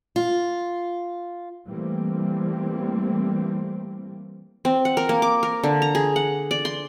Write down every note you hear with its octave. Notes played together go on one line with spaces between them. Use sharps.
F4
E3 G3 A3 A#3 C4
C4
F#5
A#4
A#3
D6
A#4
D3
A#5
G#4
F#5
D5
C6